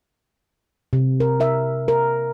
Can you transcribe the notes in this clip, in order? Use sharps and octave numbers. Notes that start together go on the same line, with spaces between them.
C3
A#4
A#4 E5
A#4